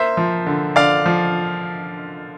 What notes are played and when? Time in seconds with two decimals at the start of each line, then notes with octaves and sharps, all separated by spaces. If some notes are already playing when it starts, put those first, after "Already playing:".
Already playing: A#3 C5 E5
0.17 F3
0.46 D3
0.76 D3 D5 F5
1.06 F3